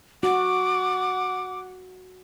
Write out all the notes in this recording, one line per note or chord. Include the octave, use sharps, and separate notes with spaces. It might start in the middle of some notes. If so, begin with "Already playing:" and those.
F#4 F#5 D6